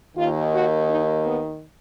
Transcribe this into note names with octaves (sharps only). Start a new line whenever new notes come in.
D#2 D#3 F4
F#4
D#4
B3